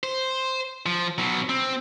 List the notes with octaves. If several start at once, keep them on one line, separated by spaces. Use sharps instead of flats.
C5
F3
B2 F#3
C4